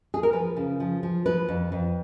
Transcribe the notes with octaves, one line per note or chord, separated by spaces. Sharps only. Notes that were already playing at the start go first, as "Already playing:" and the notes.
G#4
A#4
F3 B4
C#3
F3
F3
F3 B4
F2
F2